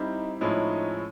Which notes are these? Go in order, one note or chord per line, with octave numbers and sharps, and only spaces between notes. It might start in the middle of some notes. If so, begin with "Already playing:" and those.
Already playing: G3 C4 D#4 E4 G4
A2 F3 G#3 C#4 D#4 E4